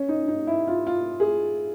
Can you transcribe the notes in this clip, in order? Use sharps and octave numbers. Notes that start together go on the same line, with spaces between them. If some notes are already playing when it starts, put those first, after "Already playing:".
Already playing: C#4
D#4
D#4
E4
F4
F4
G#4